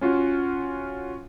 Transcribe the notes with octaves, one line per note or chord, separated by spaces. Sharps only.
C#4 F4 F#4